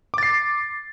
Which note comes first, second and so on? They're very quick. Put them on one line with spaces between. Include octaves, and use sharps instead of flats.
D6 A6 C7